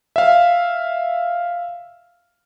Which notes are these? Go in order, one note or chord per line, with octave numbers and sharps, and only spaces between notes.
E5 F5